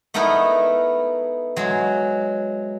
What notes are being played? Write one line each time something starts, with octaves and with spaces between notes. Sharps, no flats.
A3 B3 D#4 E4 A#4
F#3 G#3